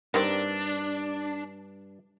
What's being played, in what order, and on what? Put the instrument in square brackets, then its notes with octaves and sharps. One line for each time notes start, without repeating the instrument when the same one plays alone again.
[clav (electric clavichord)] G2 A#5 [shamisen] D#3 A#3 C4 [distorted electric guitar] D4